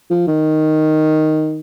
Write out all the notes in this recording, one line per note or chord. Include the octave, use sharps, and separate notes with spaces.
F3
D#3